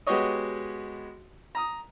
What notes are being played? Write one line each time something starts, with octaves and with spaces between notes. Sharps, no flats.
G#3 B3 F#4 G4 C#5 D#5
A#5 D#6